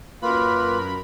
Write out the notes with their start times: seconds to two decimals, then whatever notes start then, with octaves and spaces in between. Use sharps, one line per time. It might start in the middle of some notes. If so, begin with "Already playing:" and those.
0.22 F#2 A#3 F4 A#4 B4 B5